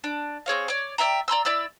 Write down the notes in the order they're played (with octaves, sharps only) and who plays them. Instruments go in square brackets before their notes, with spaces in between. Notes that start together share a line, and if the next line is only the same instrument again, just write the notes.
[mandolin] D4
C4 G#4 C#5 F5
C#5 D5
D5 E5 G5 A#5
D5 A#5 C6 E6
E4 D5 E5 E6